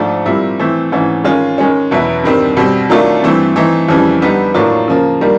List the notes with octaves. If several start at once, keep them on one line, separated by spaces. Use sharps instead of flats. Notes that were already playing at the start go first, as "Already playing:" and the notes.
Already playing: G#2 F3 A3 D4
A#2 G3 C4 E4
E3 A3 C4
G#2 E3 A3 C#4
D#3 G#3 C#4 F4
D#3 G#3 C#4
E2 B2 F#3 B3 E4
G2 D#3 G3 C4
B2 G3 C4
D#3 F#3 A3 D4 F4
G2 E3 A3 C4
E3 A3 C4 D#4
F2 C#3 E3 G3
D3 G3 B3 D#4
A2 F#3 A#3 D4 F4
C#3 F3 A#3
D#3 G3 A#3 D4